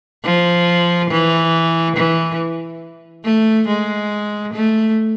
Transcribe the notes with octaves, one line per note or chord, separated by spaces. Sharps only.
F3
E3
E3
A3
G#3
A3